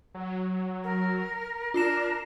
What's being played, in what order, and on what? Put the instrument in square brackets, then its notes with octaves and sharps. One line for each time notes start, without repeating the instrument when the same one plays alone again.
[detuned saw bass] F#3
[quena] A#4
[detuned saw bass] D4 [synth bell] F4 C7 E7 [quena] A#4